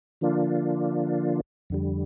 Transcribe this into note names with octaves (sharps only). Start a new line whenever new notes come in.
D3 F3 A#3 D4 F4
F2 D3 G3